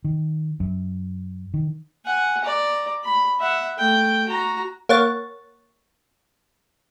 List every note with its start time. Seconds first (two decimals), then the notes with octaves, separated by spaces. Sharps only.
0.04 D#3
0.60 F#2
1.54 D#3
2.05 F#5 G#5
2.44 D5 A#5
3.04 B5
3.40 E5 F#5
3.78 A3 G5
4.27 F#4 A#5
4.89 A#3 C#5 F#5 A6